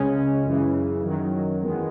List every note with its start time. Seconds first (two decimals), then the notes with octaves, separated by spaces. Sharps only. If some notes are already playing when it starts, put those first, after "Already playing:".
Already playing: C#2 C#3 G#3 C#4
0.45 F#2 C#3 E3
1.04 F#2 D#3 F#3
1.62 E2 D#3 G#3 B3